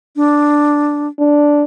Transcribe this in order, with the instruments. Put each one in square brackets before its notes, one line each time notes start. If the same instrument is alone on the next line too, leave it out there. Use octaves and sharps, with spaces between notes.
[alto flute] D4
[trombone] D4